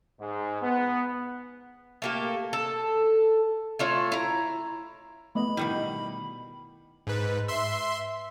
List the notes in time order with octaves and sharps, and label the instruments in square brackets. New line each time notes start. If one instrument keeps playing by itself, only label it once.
[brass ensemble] G#2
B3
[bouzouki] A3 A#3 G4
A4
A3 F4 C#5
E4 A#5
[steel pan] A3 B3 D#5 [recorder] B5
[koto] B2 D#3 G3 [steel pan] E4
[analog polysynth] G#2 B4
E5 C6